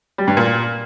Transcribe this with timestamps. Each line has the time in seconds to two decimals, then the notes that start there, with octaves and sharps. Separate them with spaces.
0.18 G3
0.28 G2
0.37 A#2